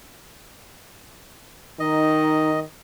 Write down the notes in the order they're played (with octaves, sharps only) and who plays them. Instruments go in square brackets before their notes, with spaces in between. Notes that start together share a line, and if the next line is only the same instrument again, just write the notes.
[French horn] D#3 [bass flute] D#4 [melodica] D#5